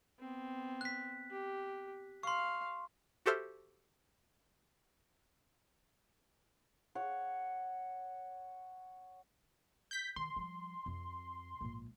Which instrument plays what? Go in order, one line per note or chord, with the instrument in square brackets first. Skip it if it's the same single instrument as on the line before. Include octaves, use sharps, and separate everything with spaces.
[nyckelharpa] B3 C4
[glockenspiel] F#6 B6
[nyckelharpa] G4
[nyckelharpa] F5 [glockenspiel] C6 C#6
[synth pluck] F#4 G4 A4 C5 E5 F6
[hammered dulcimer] C#5 F#5
[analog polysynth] G6 B6
[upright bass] D#3 [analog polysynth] C6
[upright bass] F3 G3
F2 C4
A#1 G#2